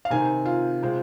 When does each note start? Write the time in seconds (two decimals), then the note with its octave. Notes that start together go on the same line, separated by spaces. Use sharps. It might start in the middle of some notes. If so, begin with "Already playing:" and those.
0.05 F5
0.10 C3 D#3 C4 D#4 G#5
0.45 F4
0.83 C3 G#3 C4 F4